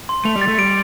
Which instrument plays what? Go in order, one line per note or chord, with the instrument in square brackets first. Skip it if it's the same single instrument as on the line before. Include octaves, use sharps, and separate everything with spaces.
[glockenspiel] C6
[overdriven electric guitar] A3 [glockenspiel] F7
[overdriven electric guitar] G3
[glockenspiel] A6
[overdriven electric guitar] A3
[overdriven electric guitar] G3 [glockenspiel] D7